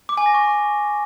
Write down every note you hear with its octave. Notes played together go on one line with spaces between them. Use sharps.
D6
G#5
A#6
C#6